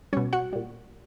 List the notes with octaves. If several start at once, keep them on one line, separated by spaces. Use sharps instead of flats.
B2 G3 C#4 C#5
F#4 F#5
A#2 G3